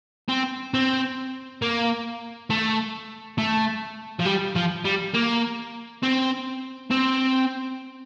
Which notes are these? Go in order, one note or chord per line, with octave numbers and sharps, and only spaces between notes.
C4
C4
A#3
A3
A3
F3
G3
F3
G3
A#3
C4
C4